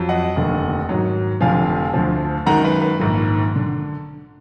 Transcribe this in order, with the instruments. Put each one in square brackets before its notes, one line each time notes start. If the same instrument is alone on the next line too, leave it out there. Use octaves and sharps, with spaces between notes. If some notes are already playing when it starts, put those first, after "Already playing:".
Already playing: [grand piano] F2 F#3
D#5 F#5
F1 D#2 D3
G#2 D#3 F#3
F1 F2 D3 F3 F5 G#5
D2 D3 F3
F#2 D#3 G#3 F#5 A#5
B4
B4
A#1 G#2 D#3
D3